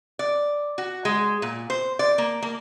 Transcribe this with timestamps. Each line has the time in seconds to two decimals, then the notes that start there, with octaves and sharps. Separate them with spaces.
0.19 D5
0.78 F#4
1.05 G#3
1.42 A#2
1.70 C5
1.99 D5
2.18 A#3
2.42 A#3